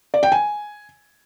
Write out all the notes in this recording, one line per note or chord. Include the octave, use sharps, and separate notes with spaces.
D5
G5
G#5